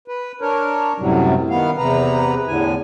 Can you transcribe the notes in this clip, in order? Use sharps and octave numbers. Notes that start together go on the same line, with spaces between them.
B4
D4 A#4 C#5
F#2 A2 C3 F#3 G3
D#3 B3 F5
E2 C3 B4 A#5
E2 A2 D3 G#5